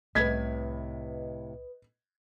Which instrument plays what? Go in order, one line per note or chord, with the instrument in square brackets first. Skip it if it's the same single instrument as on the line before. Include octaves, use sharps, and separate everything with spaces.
[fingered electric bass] C2 G3 [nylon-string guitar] A2 C3 [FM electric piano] B4 D#5 [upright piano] G#6 B6